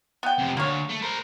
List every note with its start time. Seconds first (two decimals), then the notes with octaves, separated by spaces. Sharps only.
0.23 B3 G5
0.39 F2 C3
0.57 D2 A#3 C#5
0.89 A3
1.02 A#4 C5